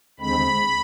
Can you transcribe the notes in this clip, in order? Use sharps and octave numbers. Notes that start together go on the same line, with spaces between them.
D#2 D3 G#3 C4 B5